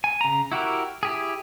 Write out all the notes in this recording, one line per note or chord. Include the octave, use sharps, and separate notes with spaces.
G#5
C#3 A#5
E4 F#4 G4 A#4
E4 G4 G#4